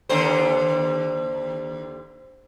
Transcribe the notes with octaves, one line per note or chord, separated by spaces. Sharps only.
D#2 D3 C5